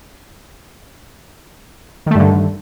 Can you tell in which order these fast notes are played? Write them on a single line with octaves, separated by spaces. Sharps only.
D#3 A3 G2 D3